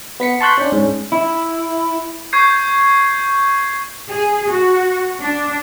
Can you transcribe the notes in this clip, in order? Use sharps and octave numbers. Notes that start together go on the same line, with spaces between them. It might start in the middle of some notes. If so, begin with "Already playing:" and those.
B3 B6 C#7
A5 C6 C#6 F#6 G6 B6
C#4 D4
G#2 C#4
E4
C#6 G6 G#6 C7
G#4
F#4
D4